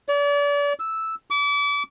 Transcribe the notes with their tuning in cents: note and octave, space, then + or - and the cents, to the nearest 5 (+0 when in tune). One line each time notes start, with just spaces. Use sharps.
D5 -40
E6 -5
D6 -35